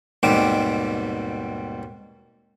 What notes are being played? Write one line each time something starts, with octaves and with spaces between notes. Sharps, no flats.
D#2 G#2 B2 G3 C4 D6